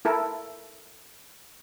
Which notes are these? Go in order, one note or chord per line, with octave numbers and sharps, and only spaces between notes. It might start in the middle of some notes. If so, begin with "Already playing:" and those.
E4 A4 A#4